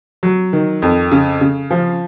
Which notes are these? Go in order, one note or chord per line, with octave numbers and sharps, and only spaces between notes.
F#3
D#3
F2
C#3
C#3
F3